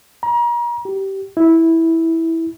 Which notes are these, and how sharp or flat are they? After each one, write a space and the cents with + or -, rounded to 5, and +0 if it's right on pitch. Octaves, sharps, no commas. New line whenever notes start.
A#5 +35
G4 -20
E4 -10